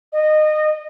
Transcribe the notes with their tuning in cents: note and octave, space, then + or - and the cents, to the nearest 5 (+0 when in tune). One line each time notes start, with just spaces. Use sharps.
D#5 -20